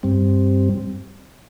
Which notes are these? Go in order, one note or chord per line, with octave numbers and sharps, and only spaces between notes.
G2 G3 C4